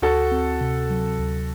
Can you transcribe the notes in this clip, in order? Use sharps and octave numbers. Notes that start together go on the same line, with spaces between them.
D2 F#4 A4
C4
C3
F#3
D2